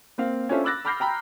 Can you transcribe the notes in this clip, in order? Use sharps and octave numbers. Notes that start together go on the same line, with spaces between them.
A#3 C4 F5
C#4 D4 F4 A4 C5 E5
B5 D6 E6 F#6 A6 A#6
B5 D6 F6 G6 A#6 C7
G5 A#5 B5